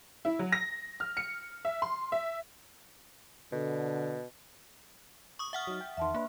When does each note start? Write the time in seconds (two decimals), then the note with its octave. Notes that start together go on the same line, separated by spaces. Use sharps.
0.25 E4
0.39 F#3
0.52 A#6
1.00 F6
1.17 C#7
1.65 E5
1.82 C6
2.12 E5
3.52 B2 D3
5.39 C#6 D#6
5.53 E5 F#5 F6
5.67 F#3 D#4
5.81 G5
5.97 E2 D#3 E5 A5 C6
6.14 A#3 D4 B4 E5